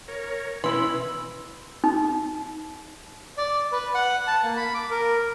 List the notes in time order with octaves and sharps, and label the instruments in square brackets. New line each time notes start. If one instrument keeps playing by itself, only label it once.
[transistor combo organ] A#4 C#5
[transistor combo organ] B2 C#4 [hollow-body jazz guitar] E3 E4 [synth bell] B4 [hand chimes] C6 E6
[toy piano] D#4
[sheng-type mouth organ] D5
B4
F#5
A5
A#3
B5
D6
A#4